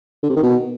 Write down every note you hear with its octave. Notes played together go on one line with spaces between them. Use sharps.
D3
C3
D#3
B2